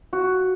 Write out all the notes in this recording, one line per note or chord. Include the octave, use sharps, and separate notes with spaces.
F#4